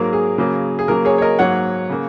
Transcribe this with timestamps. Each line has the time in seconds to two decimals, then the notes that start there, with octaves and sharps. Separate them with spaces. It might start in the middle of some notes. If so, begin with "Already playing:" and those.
Already playing: G#2 F#3 A#3 A#4
0.13 G#4
0.38 C#3 F#3 A#3
0.79 G#4
0.88 C#3 F#3 A#3 A#4
1.05 G#4 C#5
1.18 C#5
1.22 A#4 D#5
1.39 G#2 F#3 A#3 C#5 F#5
1.89 C#3 A#3